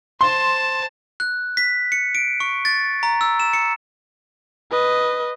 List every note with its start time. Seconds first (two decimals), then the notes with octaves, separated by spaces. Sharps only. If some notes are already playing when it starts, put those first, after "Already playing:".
0.21 C5 A5 C6
1.20 F#6
1.57 B6
1.92 C#7
2.15 D7
2.40 C#6
2.65 A6
3.03 A#5
3.21 E6
3.40 E7
3.53 C#7
4.71 B4 D#5